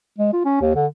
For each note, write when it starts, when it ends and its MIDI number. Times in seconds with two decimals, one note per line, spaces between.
0.18 0.31 56
0.33 0.43 65
0.45 0.60 61
0.61 0.74 39
0.76 0.86 50